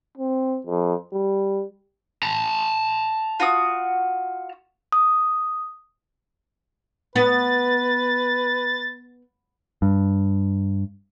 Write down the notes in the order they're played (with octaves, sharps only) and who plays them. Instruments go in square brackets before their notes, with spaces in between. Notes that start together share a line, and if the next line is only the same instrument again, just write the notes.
[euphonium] C4
F2
G3
[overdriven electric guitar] A5 A#5
[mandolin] F4 F#4 D#6
[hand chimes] D#6
[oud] B3 [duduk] B4 [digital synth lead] A6
[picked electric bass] G2